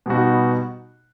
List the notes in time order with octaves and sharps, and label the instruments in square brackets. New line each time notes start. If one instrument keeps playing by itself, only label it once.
[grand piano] B2 G3 B3 D#4 F#4